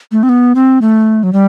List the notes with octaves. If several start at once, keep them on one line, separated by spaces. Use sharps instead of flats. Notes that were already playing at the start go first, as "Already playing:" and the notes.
A3
C4
B3
C4
A3
F#3
G3